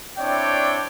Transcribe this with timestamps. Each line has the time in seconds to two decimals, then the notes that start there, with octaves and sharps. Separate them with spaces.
0.19 C4 D4 E4 C#5 D5 G5